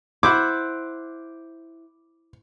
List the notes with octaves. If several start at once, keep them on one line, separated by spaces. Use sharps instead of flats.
E4 C5 F#5 D6